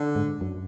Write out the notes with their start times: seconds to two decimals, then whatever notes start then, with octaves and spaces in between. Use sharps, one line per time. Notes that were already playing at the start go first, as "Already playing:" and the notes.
Already playing: D3
0.16 G#2
0.41 F#2